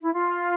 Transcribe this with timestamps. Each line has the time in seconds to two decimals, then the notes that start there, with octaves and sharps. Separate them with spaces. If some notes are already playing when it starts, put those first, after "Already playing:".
0.02 E4
0.14 F4